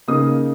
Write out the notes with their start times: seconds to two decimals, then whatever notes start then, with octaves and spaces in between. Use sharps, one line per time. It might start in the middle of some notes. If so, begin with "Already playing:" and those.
0.08 C#3 A#3 D#4 D#6